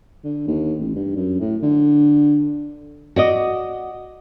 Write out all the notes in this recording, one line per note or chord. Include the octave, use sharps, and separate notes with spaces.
D3
D#2
A1
G2
F#2
A2
D3
F#4 D5 D#5